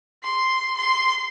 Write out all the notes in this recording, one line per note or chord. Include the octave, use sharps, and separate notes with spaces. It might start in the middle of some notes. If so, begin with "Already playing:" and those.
C6
C6